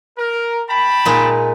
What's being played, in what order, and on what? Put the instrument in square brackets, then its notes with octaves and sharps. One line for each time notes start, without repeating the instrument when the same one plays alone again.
[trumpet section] A#4
G5 A5 B5
[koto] A#2 G#3 D#4